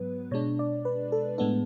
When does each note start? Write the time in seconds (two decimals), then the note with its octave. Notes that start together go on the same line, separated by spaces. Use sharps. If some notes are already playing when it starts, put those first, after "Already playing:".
Already playing: G#2 F#3 B3 B4
0.31 B2 G#3 D4 C#5
0.59 D5
0.85 B4
1.12 A4
1.38 A2 G#3 B3 D4 A4